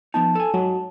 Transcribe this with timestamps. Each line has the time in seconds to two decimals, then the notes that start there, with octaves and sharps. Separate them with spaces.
0.14 F3 B3 D#4 A5
0.35 A4 G#5
0.54 G#2 F#3